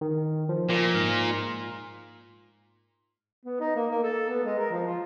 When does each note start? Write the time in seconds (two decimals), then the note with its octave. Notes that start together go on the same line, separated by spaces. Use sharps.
0.01 D#3
0.49 F3
0.69 A#2
0.94 G#2 F6
3.46 B3
3.60 D#4
3.76 A#3
3.91 A#3
4.03 A4
4.28 B3
4.45 G#3
4.59 A#4
4.71 F3
4.86 F4